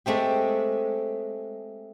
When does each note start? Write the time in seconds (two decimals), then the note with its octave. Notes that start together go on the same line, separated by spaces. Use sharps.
0.06 G#3 A3 C4 G4